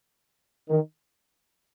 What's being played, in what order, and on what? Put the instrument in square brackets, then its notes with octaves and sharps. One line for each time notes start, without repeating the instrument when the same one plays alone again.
[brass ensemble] D#3